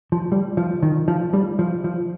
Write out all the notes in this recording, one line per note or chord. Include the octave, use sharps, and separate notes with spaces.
F3
G3
F3
D#3
F3
G3
F3
F3